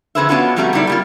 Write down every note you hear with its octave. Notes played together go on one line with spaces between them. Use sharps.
F2 D3 G#4 B4 C5 E5
B3 C#4 D4 F4 F#4 B4
F2 B2 G3 A3 F#4 A#5
G3 A3 B3 D#4 E4 D5
G3 A#3 F4